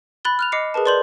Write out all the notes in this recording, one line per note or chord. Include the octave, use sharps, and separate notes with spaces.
B5 F#6 A6 G7
F6 F#6 F7
D#5 D6 C7 C#7
G#4 A#4 B4 A5
B4 D5 C6 G6 F#7